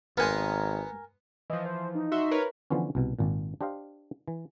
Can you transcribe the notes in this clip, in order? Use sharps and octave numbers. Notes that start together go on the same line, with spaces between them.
G#1 B3 A#4 F#5 G#5 C6
E3 F3 D#5
C5
D#4
F#4 E5 C6
A#4 B4 C#5
D3 E3 F3 B3 C#4
C2 B2
G#1 A#2
D4 G4 C5 D#5 F5
E3